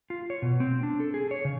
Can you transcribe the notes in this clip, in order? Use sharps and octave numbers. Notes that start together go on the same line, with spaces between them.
F4
C#5
B2
C4
D4
A4
G#4
C#5
C#3